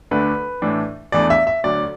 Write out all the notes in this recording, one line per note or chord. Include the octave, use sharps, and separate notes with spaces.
D2 D3 A3 D4 B4
A2 E3 A3 D4
E2 E3 A3 D4 D5
E5
E5
D2 D3 F#3 D5